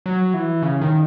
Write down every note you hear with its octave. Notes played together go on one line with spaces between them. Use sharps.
F#3
E3
C#3
D#3